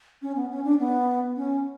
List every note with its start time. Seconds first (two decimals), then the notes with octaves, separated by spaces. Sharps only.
0.22 C#4
0.36 B3
0.51 C#4
0.65 D4
0.80 B3
1.37 C#4